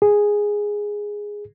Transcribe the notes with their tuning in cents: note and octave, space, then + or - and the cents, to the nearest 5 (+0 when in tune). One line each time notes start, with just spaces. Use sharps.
G#4 -5